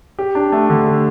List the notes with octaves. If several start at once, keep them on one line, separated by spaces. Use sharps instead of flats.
G4
D4
A3
D3
G4